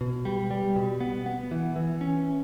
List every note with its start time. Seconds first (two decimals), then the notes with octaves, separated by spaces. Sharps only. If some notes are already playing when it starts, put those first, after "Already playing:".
0.01 B2
0.25 G3
0.51 G3
0.76 B2
1.00 B3
1.26 B3
1.51 E3
1.76 E3
2.01 C#4